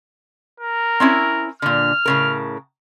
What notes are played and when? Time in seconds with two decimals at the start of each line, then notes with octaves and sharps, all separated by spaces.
0.60 A#4
1.00 C4 C#4 E4
1.62 A#2 D3 F6
2.05 A2 C#3 A#4